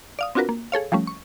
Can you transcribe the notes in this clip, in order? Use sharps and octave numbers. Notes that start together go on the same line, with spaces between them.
D5 F5 D#6
C4 D4 F4 F#4 A#4 B4
A#3
G#4 A4 C#5 F5
F3 G3 A3 C#4
C#6